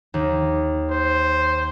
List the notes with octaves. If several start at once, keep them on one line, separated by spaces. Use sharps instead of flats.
D#2
C5